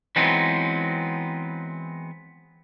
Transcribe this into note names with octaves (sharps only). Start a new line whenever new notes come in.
E3 F#3 G#3 B3 C4 D#4